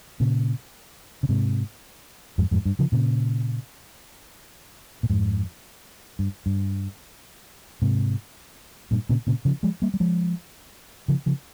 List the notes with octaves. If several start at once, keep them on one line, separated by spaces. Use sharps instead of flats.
A#2 C#3
C#3
G#2 C3
F2 G#2
F2 G#2
G2
C#3 F3
A#2 C#3
A#2
F2 G#2
G2
G2
G#2 C3
G2 A#2
A#2 C#3
A#2 C#3
C#3 F3
F3 G#3
G3 A#3
G3
F3 G#3
C#3 F3
C#3 F3